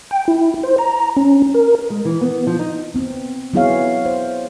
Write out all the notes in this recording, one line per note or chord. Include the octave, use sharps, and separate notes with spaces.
G5
E4
C5
A#5
C#4
A#4
G#3
E3
B3
F3
D#4
B3 C4
F#3 B3 E4 G#4 C#5 F5
C5